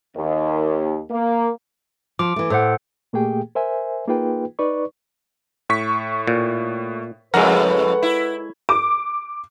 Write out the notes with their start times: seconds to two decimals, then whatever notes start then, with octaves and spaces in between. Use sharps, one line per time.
0.16 D#2
1.10 A#3
2.19 F3 D6
2.36 E3 A3
2.50 A2 A4 C5 F#5
3.13 A#2 A3 A#3 G4 G#4 G5
3.55 A#4 C5 E5 G#5
4.08 A#3 D#4 F4 G#4 B4 G5
4.59 D#4 B4 D5 C#6
5.69 A2 C#6 B6
6.27 A#2
7.34 F2 A2 C#3 G#3 A#4 B4 F#5
8.03 E4
8.69 D6